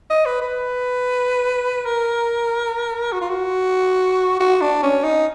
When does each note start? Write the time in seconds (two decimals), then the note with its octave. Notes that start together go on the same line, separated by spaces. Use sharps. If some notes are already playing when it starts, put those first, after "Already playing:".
0.10 D#5
0.25 B4
0.41 B4
1.85 A#4
3.12 F#4
3.21 F4
3.30 F#4
4.40 F#4
4.61 D4
4.83 C#4
5.04 D#4